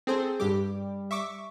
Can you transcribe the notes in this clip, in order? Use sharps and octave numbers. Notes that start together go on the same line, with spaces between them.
C4 G#4 A4 C5
G2 G3 G4 D6
E5 C#6 D6